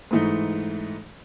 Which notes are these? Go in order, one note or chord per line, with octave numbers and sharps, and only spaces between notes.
G#2 E3 A3 D#4